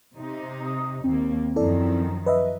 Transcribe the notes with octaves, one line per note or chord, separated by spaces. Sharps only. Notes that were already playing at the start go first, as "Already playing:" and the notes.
C3 D#4
D#6
D#2 A#3 C4
F#2 D#3 F3 E4 A4 D5
B4 D#5 E5